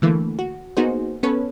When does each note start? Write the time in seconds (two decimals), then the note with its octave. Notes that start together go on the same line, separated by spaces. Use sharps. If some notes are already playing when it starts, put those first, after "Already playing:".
0.02 D3 E3 A3 A#3
0.39 F#4
0.77 A#3 B3 D#4 F#4 G#4 C5
1.23 B3 C#4 A4 B4 C#5